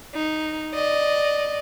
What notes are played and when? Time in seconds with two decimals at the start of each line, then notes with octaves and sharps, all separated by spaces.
0.15 D#4
0.74 D5 D#5